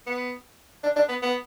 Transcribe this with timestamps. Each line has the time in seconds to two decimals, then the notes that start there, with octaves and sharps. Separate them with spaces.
0.06 B3
0.83 D4
0.96 D4
1.09 B3
1.22 B3